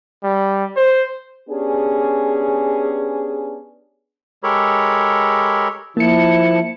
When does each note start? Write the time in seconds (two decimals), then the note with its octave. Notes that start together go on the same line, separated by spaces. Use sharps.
0.24 G3
0.77 C5
1.49 B3 C#4 D4 G4 G#4
4.43 G#3 G4 A4 A#4 C#5 B5
5.97 F3 A#3 E4 A5 C#7